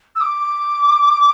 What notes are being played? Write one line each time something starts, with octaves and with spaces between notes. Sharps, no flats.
E6
D6